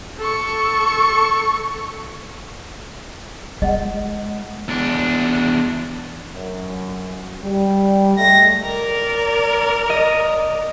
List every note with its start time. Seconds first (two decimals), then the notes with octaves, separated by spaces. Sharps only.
0.18 A4 C#6
3.62 G#3 D#5 F#5
4.68 E2 D4
6.34 F#2
7.44 G3
8.17 G#3 A3 G5 A#6
8.64 A#4 D5
9.90 D#5